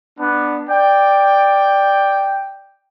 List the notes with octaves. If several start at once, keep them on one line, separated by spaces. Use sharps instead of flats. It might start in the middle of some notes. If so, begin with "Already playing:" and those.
B3 D4
D5 G5